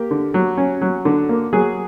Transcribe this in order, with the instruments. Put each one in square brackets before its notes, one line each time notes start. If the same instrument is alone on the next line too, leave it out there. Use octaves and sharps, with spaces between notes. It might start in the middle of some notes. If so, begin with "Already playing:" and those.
Already playing: [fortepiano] A#3 G4
D3
F#3
C#4
F#3
D3
A#3
F#3 G#4